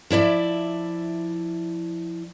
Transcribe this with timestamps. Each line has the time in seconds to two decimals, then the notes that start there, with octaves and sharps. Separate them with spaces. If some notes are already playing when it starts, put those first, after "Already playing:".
0.10 F3 E4 D5 E5